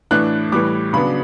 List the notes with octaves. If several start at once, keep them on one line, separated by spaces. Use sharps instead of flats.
A2 E3 A3 D4 F#6
A2 E3 G3 D6
C#3 F#3 B3 D4 B5